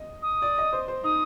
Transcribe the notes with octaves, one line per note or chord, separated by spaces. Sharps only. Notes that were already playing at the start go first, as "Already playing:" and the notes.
Already playing: D#5
D#6
D5
D#5
C5
C5
D#4 D#6